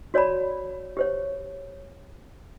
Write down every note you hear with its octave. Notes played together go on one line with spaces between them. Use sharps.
F#4 C#5 D5 A5 B5
G4 C5 C#5